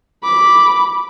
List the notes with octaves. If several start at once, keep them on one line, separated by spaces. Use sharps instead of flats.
B5 D6